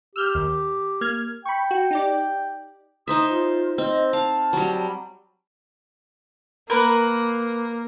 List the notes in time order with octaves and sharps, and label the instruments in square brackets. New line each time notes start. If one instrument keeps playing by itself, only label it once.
[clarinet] G4 [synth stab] E6 F6 G6
[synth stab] D#2
A#3 F6 G#6
[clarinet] G5 [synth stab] B5 C#6
[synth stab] F#4
D#4 G4 D5
[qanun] D#4 C5 E5 [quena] D#6
[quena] F4
[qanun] C4 [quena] D#5
[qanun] F5 [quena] A5
[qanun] F#3 G3
[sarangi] A#3 [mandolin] A#4 B4